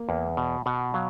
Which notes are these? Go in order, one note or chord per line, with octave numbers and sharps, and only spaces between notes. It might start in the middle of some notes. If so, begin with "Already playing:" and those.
Already playing: A#3
E2
B2
B2 F#5
F#3 F5